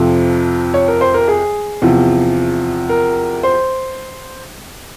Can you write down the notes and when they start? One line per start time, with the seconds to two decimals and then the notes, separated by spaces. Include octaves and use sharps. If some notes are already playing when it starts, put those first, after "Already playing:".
Already playing: F2 C3 F3 C5
0.74 C#5
0.88 A#4
1.01 C5
1.14 A#4
1.28 G#4
1.82 E2 C3 F3
2.89 A#4
3.43 C5